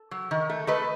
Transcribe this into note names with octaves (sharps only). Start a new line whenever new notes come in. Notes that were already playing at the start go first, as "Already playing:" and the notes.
Already playing: A4
F#3
D#3
A3
A3 B4 D#5